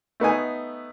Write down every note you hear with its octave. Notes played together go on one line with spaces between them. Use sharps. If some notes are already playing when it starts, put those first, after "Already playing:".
A3 B3 D#4 G#5